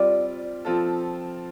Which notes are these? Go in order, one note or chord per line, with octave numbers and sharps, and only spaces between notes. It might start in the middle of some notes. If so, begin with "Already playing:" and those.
Already playing: G3 C4 F4 D5
F3 C4 F4 A4